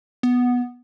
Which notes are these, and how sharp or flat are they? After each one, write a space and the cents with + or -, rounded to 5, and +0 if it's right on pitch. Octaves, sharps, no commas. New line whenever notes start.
B3 -5